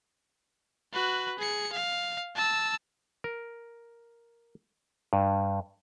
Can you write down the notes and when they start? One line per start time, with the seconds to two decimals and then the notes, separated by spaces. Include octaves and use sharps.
0.93 F#4 B4
1.39 G#4 C#7
1.72 F5
2.35 A5 E6
3.24 A#4
5.13 G2